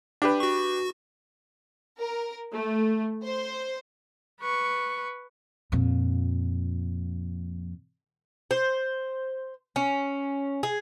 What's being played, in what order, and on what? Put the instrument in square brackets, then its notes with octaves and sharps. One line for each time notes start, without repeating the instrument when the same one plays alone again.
[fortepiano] D4 G4 B4
[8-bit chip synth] F#4 C#6
[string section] A#4
A3
C5
[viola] B4 C#6
[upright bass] F2 A#2
[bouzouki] C5
C#4
G#4